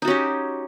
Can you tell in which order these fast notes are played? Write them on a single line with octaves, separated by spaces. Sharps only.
D#4 F#4 C#4 G4